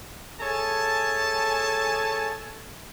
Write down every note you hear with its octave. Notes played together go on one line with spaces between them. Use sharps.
G#4 A4 C#5 E5 G#5 A5